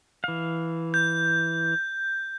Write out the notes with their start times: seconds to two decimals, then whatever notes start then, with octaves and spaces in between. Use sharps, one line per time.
0.24 E3 F5
0.94 G6